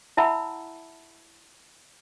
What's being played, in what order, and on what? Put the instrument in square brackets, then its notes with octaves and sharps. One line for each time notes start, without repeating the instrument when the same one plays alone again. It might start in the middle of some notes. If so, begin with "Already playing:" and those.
[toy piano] E4 E5 F#5 A5 B5 E6